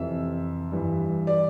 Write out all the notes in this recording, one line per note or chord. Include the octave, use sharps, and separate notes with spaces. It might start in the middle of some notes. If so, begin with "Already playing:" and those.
Already playing: F2 C3 E3 E5
G2 E3
D5